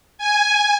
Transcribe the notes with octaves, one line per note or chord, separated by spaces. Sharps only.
G#5